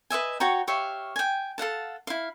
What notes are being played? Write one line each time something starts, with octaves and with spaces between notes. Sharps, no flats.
B4 D#5 E5 G#5
F#4 C#5 G5 A#5
G4 C#5 E5 F5
G5 G#5
A4 F5 F#5 A5
E4 F5